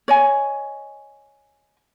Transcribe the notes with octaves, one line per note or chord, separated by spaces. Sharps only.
C#5 D#5 G#5